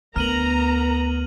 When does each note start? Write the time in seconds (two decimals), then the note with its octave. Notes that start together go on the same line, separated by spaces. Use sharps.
0.16 D2 B3 A#4 A#5 F6 D#7 F#7